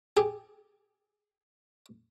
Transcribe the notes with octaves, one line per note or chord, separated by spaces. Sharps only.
G4 G#4